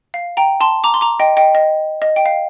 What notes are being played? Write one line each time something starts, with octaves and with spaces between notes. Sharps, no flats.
F5
G5 A#5
A5 C6
A#5 D6
C6
A#5 D6
D#5 G5
D#5 G5
D#5
D#5
G5
F5